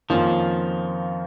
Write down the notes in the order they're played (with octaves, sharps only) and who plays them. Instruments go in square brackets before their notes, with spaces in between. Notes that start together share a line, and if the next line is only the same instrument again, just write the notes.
[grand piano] F2 D#3 A#3 C#4 F4 [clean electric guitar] F3